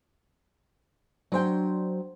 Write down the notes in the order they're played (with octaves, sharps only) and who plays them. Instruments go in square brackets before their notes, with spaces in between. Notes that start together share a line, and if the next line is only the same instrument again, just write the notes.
[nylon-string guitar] F#3 G5 [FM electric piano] D4 C5